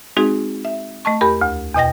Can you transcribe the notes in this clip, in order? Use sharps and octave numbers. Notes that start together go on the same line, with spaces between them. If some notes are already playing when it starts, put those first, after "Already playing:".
G#3 C4 D#4 F#4 G#4
E5
A3 D#5 A5 C#6
E2 G4 A#4 B5
D2
E2 B2 D#5 G5 A#6